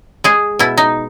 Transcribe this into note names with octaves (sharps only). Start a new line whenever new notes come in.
G#3 G#4
B2 E4
D#4